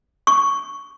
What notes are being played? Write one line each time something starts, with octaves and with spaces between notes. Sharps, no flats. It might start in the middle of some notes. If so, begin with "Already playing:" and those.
C#6